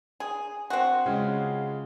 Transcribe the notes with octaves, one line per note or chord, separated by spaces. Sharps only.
G#4
C4 F#4
C#3 G#3 F4